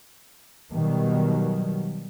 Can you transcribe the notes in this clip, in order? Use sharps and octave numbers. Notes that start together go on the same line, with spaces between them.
B2 D#3 F#3 G3